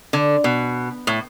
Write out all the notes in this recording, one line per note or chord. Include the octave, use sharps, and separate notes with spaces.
D3
B2
A2